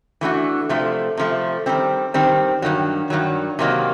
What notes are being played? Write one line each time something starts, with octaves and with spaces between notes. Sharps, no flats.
E3 A3 D4 F#4
C3 F3 A3
C3 F3 A3
D#3 G3 C4
D#3 G3 C4
G2 D#3 F#3
G2 D#3 F#3
C3 D#3 F#3 A#3